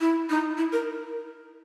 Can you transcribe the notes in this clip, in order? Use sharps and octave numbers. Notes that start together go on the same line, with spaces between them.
E4
D#4
E4
A#4